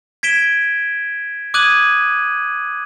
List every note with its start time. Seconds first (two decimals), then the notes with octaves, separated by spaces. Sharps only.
0.23 G#6 B6 D7 E7 G7
1.54 D6 D#6 F#6 G#6 D#7 F#7